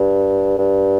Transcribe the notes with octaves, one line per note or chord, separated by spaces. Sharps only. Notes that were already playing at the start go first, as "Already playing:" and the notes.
Already playing: G2
G2